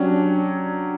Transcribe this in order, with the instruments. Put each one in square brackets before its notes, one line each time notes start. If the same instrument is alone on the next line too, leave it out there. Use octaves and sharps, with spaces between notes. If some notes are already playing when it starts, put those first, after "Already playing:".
Already playing: [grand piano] F#3 C#4 G4 [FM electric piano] D4